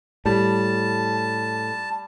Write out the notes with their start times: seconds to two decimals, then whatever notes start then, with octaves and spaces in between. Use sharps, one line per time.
0.26 A2 G3 A5